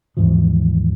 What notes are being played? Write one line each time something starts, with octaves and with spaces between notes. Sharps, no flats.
D#2 G#2 E3 F3